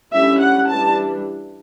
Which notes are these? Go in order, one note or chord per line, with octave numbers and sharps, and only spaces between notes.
D3 G3 C#4 E4 E5
F#5
E3 G3 D4 A5